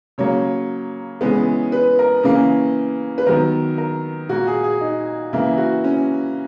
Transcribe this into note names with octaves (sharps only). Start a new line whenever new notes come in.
C#3 F#3 A#3 C#5
C#3 E3 G#3 B3
B4
A#4
C#3 E3 A#3 C#4
B4
D#3 F#3 B3 A#4
A#4
A#2 A#3 F#4
G#4
G#4
D#4
C#3 E3 A#3 E4
F#4
C#4